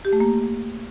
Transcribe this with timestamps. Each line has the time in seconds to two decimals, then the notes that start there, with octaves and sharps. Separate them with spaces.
0.05 G4
0.13 A3
0.20 A#3